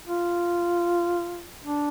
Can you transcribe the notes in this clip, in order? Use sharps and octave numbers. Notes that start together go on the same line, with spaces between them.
F4
D4